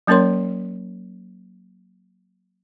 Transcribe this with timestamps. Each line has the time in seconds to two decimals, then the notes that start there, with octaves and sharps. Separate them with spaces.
0.07 F#3 A#3 C#4 A#4 C#5 C6